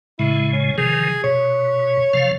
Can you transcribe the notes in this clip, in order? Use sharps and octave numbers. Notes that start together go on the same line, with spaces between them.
A2 C#3 G#3 E4
C#4
C3 D#3 F3 G#4
B2 C#5
C3 F3 F5